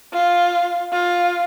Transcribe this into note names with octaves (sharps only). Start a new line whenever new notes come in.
F4
F4